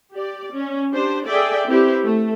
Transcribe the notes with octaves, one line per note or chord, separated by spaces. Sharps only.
G4 D5
C#4
D4 G4 C5
G#4 A4 D5 E5 G5
C4 E4 G4 B4
A3